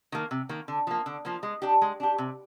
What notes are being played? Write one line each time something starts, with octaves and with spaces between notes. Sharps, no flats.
D#3 A#3
C3
D#3 A#3
D3
F3 A#3
D3
F3 A#3
G#3
D4 G4
G#3
D4 G4
C3